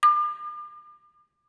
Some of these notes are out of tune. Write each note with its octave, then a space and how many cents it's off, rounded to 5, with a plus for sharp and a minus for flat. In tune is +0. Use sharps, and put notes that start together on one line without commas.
D6 +40